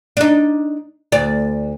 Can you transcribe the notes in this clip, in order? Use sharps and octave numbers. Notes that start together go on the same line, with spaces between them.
D4 D#4
D2 D5